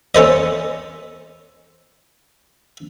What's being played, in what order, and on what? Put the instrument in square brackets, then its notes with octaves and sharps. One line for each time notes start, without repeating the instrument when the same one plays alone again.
[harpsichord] C#4 A4 C5 D#5